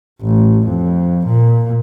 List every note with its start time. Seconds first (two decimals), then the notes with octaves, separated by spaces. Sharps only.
0.22 A1
0.68 F2
1.26 A#2